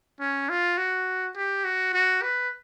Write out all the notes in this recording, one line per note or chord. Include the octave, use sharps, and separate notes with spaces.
C#4
F4
F#4
G4
F#4
F#4
B4